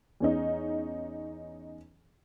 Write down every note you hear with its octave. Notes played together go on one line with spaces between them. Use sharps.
E2 C#4 D#4